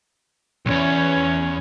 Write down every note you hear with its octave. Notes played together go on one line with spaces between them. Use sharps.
B1 E2 C#4 C#5